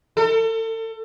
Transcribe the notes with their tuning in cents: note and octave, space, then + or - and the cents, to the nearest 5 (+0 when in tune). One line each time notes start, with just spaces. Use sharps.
A4 +35